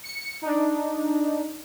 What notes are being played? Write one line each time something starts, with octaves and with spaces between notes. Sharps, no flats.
C#7
D4 D#4